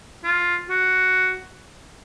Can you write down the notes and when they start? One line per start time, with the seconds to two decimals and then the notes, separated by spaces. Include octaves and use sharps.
0.24 F4
0.69 F#4